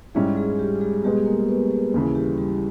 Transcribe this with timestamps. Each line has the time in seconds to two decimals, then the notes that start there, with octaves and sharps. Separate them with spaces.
0.14 G#2 G3 G#3 C#4 E4 G#4
0.36 G#3 G#4
0.59 G3 G4
0.81 G#3 G#4
1.04 B2 G3 G#3 B3 G4
1.26 A#3 A#4
1.49 B3 B4
1.71 G#3 G#4
1.94 D#2 C#3 E3
2.07 E4
2.15 G3 G4
2.38 G3 G4